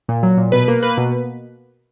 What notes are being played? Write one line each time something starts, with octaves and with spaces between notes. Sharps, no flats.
A#2
F#3
A#2
B2 B4
A#3
A#3 B4
B2